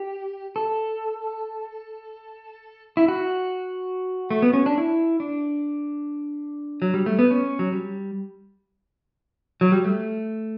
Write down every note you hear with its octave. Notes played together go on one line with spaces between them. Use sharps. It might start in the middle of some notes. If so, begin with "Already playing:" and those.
Already playing: G4
A4
E4
F#4
A3
B3
C#4
D4
E4
D4
F#3
G3
A3
B3
C#4
F#3
G3
F#3
G3
A3